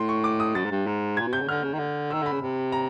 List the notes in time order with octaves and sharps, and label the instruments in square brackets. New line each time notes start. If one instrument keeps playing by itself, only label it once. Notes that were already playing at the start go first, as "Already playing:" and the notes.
Already playing: [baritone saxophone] A2 [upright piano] C6
[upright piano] C#6
D6
D#6
[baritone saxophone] F#2 [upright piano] A6
[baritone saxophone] G#2
G2
G#2
[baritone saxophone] A#2 [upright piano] G#6
[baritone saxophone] B2
[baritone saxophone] C3 [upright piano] G6
[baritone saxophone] C#3
[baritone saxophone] D3 [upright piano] F6
[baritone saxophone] C#3
D#3
D3
[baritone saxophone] D#3 [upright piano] E6
[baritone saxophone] D3 [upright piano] B5
[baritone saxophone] C#3
C3
[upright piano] A#5